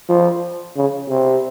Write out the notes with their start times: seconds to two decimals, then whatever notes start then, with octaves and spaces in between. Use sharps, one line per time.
0.09 F3
0.76 C#3
1.09 C3